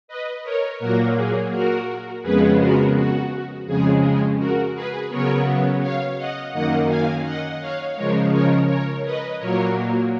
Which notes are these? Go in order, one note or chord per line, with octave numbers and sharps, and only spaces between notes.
B4 D#5
A#4 C#5
A#2 F#3 A#3 F#4 A#4
G#4
F#4 A#4
F2 C#3 G#3 B3 G#4 B4
F#4 A#4
F#4
F2 C#3 G#3 G#4
F#4 A#4
G#4 B4
C#3 F#3 B3 A#4 C#5
C#5 F5
D#5 F#5
F#2 D#3 A#3 D#5 F#5
F5 G#5
D#5 F#5
C#5 F5
C#3 F3 G#3 A#4 C#5
A#4 C#5
A#4 C#5
B4 D#5
A#2 F#3 A#3 A#4 C#5